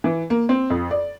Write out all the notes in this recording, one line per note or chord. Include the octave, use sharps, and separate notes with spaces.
E3
A#3
C4
F2
D5